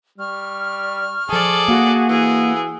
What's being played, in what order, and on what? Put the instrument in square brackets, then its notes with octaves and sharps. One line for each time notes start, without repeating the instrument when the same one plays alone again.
[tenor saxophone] G3 [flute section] C#6 F6
[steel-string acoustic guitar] F3 A5 [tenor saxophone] G#4 [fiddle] A4 D5
[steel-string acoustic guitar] A#3 [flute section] F#4 F#5
[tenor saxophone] E3 [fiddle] G#4